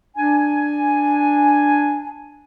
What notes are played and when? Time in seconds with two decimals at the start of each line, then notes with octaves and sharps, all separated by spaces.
0.17 D4 G#5